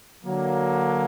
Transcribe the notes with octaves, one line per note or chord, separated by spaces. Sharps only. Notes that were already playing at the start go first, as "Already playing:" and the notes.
D3 F#3 A#3